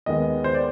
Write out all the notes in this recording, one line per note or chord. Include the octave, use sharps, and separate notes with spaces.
D#2 D#3 G#3 B3 D#5
C5
D5